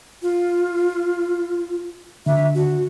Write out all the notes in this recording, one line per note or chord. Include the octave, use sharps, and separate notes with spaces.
F4
D3 E5
F#4